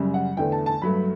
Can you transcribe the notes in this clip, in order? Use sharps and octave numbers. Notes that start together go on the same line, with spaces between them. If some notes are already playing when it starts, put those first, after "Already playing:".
Already playing: F#2 C#3 G3
F#5
E2 D3 A3 G5
A5
A5
G2 F#3 A3 B5